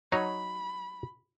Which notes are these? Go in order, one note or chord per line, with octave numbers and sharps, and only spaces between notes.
F#3 D#4 C#5 B5